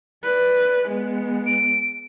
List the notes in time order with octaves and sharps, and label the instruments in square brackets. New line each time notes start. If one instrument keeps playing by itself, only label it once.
[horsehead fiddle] B4 D5
G#3 B3
[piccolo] D7